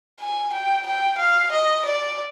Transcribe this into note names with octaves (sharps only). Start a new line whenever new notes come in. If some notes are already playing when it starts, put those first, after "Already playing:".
G#5
G5
G5
F5
D#5
D5